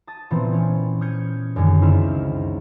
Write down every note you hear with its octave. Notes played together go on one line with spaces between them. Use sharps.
A5 D#6 A6
A#2 E3 B3 C4
C#4
D#6 F6 G6 G#6 C#7
F#2 D3 D#3 F#3 G#3 C#4
C#2 C4 D#4 E4 F6 E7